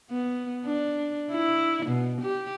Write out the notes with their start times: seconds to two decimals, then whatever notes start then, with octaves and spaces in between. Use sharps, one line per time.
0.10 B3
0.66 D4
1.31 E4
1.86 B2
2.21 G4